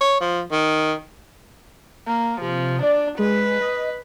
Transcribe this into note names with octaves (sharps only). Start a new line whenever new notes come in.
C#5
F3
D#3
A#3
C3 F3
D4 D5
G#3 B4
D#5